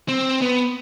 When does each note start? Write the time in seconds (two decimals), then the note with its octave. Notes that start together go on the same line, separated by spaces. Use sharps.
0.08 C4
0.42 B3